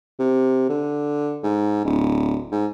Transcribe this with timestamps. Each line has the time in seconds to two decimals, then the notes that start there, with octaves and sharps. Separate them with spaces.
0.19 C3
0.69 D3
1.44 G#2
1.85 D1
2.52 G#2